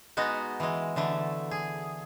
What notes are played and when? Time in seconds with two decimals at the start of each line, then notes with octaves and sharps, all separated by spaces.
0.17 G#3 B3 D#4 F#4
0.60 E3 G#3
0.96 D3 E3 A3
1.51 G#4